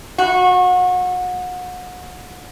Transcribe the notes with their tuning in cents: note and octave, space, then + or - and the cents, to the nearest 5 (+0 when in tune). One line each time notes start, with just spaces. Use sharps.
F#4 -30